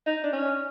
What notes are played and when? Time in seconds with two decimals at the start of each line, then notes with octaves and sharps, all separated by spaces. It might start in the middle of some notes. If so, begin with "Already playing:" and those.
0.07 D#4
0.24 D4
0.33 C#4